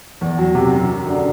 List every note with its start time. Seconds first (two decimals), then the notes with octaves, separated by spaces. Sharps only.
0.21 E2
0.38 F#3
0.55 C3
0.72 F#2
0.89 F#3
1.07 D3